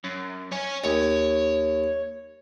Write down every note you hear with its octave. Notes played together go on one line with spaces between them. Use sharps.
F#2
C#5 G#5
D#2 C#5